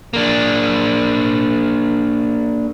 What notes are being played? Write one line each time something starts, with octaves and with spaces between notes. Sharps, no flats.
A#3 D4